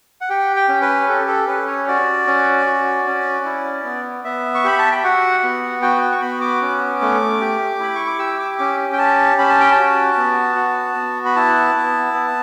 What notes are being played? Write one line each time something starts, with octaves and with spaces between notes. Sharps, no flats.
F#5
G4 G5
G5
C#4
B4
G4 A4
A4
C#4 B4
C#5
F#4 D5
C#4
F#4
C#4
E4
B3
B3 E5
C#6
G4 B5
A5
G5
F#4 F#5
B3
F#4 G5
G5
C#6
B3 B5
D6
C#4
A3
G4
E4 B5
C#6
D6
G4 E6
D6
C#4 D6
G5
G4 A5
C#4 B5
A5
G5
A5
F#4
B3
F#4
B3
B5
E4 A5
B3
B3